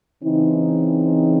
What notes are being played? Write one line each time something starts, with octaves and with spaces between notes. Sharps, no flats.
C#3 E3 C4 D#4